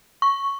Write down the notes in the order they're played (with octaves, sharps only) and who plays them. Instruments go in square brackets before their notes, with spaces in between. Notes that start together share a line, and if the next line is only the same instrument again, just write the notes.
[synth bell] C#6